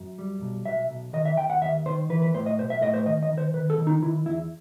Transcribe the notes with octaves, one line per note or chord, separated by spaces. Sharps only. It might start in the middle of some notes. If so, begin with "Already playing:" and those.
Already playing: F#2
G3
B1
B1 E5
B1
D#3 D#5
E5
D#2 G5
F#5
D#2 E5
D#3 C5
E3 B4
B4
A2 C5
D#5
B1 C5
E5
A2 D#5
C5
D#3 D#5
D#5
D#3
C5
D#3 B4
A4
D#3
D#4
D#3 E4
E2 E4